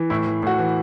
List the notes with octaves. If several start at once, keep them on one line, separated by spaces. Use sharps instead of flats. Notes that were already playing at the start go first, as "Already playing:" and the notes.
Already playing: E3
A2 E4
E3
A2 F#4
E3